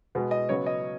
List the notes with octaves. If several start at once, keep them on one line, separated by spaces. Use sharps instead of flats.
B2 G#3 B3
D#5
C#3 F#3 B3 C#5
D#5